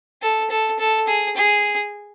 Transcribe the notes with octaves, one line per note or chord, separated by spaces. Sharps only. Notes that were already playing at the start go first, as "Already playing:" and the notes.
A4
A4
A4
G#4
G#4